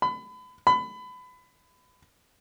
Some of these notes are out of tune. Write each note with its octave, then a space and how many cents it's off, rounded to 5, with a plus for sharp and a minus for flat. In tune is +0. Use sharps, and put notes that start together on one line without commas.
B5 +30
B5 +25